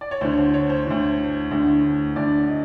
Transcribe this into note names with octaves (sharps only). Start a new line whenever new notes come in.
D5
C#5
D2 D3 C5
C5
C#5
C5
D2 D3
D2 D3
D2 D3 D5
D#5